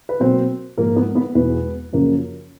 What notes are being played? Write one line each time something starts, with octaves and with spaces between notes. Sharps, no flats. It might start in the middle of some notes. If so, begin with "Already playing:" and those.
B4
B2 F#3 A#3 C4 C5
G#2 F3 A#3 A#4
B3 B4
B3 B4
E2 B2 G#3 B3 B4
F#2 C#3 F3 A#3